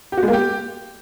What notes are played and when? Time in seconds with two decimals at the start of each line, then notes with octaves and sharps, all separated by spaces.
0.12 G4
0.17 F#4
0.23 G#3
0.28 A#3
0.33 G4